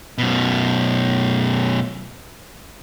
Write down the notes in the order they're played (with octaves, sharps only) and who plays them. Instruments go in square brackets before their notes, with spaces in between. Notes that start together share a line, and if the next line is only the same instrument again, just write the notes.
[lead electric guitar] F#2 B2